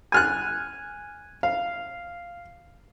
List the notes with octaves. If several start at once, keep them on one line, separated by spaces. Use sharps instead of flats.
G#5 F6 F#6
F5